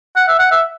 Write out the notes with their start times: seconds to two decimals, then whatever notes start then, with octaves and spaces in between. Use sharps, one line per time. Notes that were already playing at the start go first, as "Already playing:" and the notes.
0.16 F#5
0.28 E5
0.39 F#5
0.52 E5